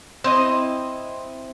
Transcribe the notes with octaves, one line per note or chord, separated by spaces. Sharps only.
C4 E4 D#5